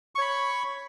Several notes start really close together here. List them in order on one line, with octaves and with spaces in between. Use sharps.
C#6 C#5 B5